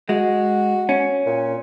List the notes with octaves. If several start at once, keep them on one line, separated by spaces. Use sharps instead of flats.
G#3 F#4
C#4
A#2